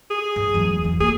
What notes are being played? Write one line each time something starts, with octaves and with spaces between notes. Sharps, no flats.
G#4
G2
E2 F#3
E3 C#4
A#3 G#4